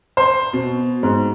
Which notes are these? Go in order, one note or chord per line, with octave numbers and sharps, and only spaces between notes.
C5
B2
G#2